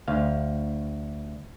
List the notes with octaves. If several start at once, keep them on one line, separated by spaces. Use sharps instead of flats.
D2 F5